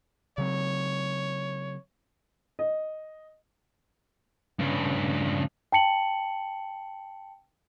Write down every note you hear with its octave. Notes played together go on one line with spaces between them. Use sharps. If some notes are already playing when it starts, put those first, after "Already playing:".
C#3 F#3 C4 C#5
D#5
G2 C#3
G5 A5 C#7 F#7